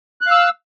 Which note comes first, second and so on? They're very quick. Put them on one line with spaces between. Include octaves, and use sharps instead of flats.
F#6 F5 E6